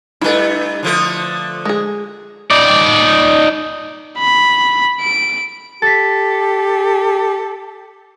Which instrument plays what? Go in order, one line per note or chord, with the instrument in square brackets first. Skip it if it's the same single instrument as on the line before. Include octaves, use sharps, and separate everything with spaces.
[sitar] G2 A3 [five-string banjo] E4 B4
[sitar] D3 F3 A3
[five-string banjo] G#3 G#4
[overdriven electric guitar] D#4 D5
[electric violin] B5
D7
[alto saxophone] G4 [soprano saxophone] A4 [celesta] A6 B6